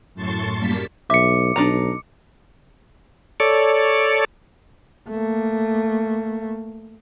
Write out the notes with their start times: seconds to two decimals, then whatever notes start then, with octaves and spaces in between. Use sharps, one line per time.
0.14 F#2 A2 A5 C6 C#6 A6
0.56 F#2 G3 A#3 A5 B6
1.10 B1 E5 D6 C#7
1.56 B1 D4 D#4 A#5
3.40 A4 C#5 D5
5.09 A3 A#3